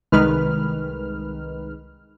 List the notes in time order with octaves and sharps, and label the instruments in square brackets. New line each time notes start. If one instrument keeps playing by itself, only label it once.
[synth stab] C2 D#3 G#3 D#4 B4 F6